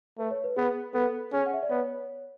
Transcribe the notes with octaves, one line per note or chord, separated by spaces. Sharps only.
A3 B4
C#5
B4
B3 G#4
B3 A4
C#4 G#4
F#5
E5
D5
B3 C#5